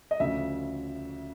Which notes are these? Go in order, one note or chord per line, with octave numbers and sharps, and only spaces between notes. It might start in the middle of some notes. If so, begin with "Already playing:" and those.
D#5
D2 C#3 F3 E5